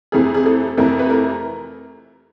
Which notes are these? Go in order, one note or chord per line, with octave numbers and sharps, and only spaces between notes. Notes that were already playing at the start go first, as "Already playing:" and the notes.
F2 C3 E3 A3 G#4
G#4
A4
F2 C3 E3 A3 A#4
B4
A#4